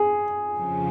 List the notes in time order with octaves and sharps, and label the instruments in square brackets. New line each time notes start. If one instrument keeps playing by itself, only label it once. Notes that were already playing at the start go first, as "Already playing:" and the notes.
Already playing: [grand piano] G#4
[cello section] F2 C#3 F3